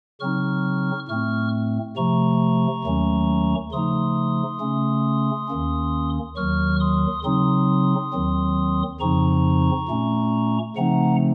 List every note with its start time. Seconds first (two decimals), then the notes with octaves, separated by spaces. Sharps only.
0.20 C#3 F#3 C4 D#4 C#6 F6
1.08 A2 A3 C4 C#6 F6
1.97 C3 F3 A3 A#5 C#6
2.84 D#2 D#3 F#3 A3 C#4
3.72 C#3 F3 A3 D#4 C6 D#6
4.60 C#3 A3 C#4
5.48 D#2 D#3 A#3 C#4
6.36 D#2 D#3 F#3 C#6 F6
6.80 C6 D#6
7.24 C#3 F#3 C4 D#4 C6 D#6
8.13 D#2 D#3 F#3 C4
9.00 F2 C#3 F3 C4 D#4 A#5 C#6
9.88 A#2 A3 C#4
10.76 C#3 F3 A3 C4 D#4 F#5 A#5